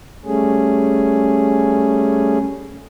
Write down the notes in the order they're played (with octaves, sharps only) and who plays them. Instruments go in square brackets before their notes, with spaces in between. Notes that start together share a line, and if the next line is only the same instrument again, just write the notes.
[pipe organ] G3 A3 C#4 G#4